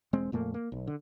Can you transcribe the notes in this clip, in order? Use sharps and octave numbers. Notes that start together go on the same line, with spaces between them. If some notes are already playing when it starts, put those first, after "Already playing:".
E1 G#3 C4
F2 A#2 A3 A#3
A#3
B1
D3